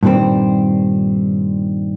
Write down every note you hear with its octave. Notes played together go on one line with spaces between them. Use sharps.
G2 A#2 D#3 G3 C4